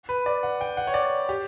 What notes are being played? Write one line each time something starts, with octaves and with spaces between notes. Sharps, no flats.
B4
D5
F#5
G5
F#5
C#5
D5
G4